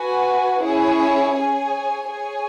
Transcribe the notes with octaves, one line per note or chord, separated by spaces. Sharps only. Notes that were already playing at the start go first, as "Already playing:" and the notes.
Already playing: F#4 B4 G#5
C#4 E4 G#4 C#5
G#4 C#5 G#5
G#4 C#5 G#5